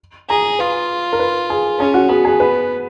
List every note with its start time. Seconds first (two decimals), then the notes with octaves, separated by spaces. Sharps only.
0.29 G#4 A#5
0.59 F4 B4
1.13 A#4
1.19 B4
1.50 G#4
1.79 C#4 G#4
1.94 F#4
2.09 B3 G#4
2.25 G#4
2.40 B4